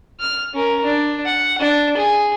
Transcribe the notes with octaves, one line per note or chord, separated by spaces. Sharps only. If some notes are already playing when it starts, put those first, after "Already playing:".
F6
C#4 A#4
D4
F#5
D4
G#4